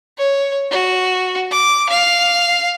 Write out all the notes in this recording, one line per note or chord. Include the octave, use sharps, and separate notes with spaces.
C#5
F#4
D6
F5